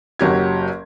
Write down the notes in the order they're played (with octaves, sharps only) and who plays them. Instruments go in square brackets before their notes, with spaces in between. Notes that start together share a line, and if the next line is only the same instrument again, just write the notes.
[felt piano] F#1 F#3 G4 G#6